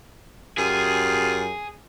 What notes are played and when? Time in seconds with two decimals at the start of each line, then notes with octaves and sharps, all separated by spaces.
0.58 F#2 F4 G4 G#4